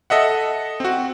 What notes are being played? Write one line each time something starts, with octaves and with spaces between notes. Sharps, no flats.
A4 D#5 E5 F#5
C4 F#4